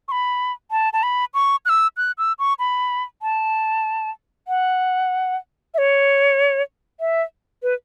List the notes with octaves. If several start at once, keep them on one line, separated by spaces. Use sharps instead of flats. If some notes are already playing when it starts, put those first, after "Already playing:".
C#6
B5
A5
A5
B5
C#6
F#6
E6
F#6
E6
C#6
B5
A5
F#5
E5
C#5
E5
B4